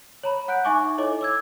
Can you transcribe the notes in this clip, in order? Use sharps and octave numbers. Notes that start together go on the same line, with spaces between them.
C#5 A#5 B5
F#5 F#6 G6 D7
D#4 E5 G#5 C#6 D6
E4 A4 C#5 D#5 D6
D6 E6 G#6